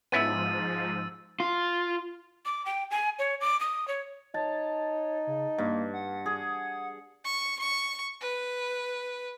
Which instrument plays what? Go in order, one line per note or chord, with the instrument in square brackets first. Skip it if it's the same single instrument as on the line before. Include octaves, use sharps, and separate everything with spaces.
[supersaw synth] G#2 F3 [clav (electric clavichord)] B3 C#4 E4 [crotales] E6 A6 D#7
[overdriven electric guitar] F4
[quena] D6
G5
G#5
C#5
D6
D#6
C#5
[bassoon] D#4 [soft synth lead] C#5 [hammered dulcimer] A5
[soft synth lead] C#3
[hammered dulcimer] G2 [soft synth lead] A#3
[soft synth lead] F#5
[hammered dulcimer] G#4
[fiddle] C#6
C#6
B4